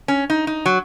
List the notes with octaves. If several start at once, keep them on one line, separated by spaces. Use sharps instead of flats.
C#4
D#4
D#4
F#3